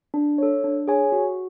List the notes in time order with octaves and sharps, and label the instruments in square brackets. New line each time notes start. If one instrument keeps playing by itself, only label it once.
[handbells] D4
A4 C#5
D4
G#4 C#5 G#5
F#4